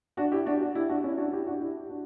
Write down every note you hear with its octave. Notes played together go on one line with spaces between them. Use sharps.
D4 F#4
E4 G4
D4 F#4
D4 F#4
E4 G4
D4 F#4
C#4 E4
D4 F#4
E4 G4
D4 F#4
E4 G4
D4 F#4